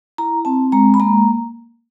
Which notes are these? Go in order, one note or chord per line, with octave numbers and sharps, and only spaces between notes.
E4 A#5
C4 A5
G#3 A#5
B5
A#3 A#5